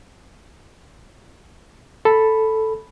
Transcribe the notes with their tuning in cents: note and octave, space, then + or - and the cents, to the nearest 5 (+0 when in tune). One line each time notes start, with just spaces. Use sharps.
A4 +0 B5 +0